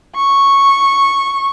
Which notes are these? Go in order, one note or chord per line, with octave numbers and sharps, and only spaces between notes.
C#6